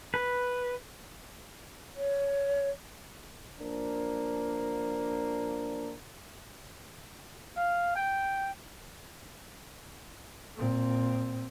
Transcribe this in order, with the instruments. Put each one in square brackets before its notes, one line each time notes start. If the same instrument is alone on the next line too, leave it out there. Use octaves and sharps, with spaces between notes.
[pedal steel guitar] B4
[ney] C#5
[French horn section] F3 A#3 D4
[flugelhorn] F5
G5
[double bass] A#2 C4